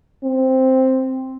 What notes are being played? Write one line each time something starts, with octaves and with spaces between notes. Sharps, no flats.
C4